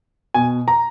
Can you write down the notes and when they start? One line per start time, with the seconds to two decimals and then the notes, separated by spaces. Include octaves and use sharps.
0.34 B2 G#5
0.68 A#5